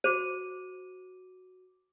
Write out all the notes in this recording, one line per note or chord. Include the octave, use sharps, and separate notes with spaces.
F#4 C5 D6 D#7